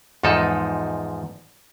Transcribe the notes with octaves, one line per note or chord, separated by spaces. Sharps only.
E2 G#2 F3 D#4 A4